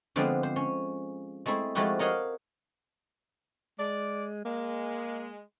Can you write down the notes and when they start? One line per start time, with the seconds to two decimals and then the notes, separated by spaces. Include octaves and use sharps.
0.16 D3 F3 G#3 B3 C4 D4
0.43 C5
0.56 C#4
1.46 G#3 A3 C4 E4
1.75 F3 G#3 A3 E4 F#4 G4
1.99 A#4 C#5 D#5 F5 F#5
3.79 G#3 D5
4.45 G#3 A#3